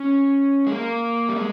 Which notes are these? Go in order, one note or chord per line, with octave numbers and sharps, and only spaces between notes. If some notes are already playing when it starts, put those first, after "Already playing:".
Already playing: C#4
G#3
A#3
G3
G#3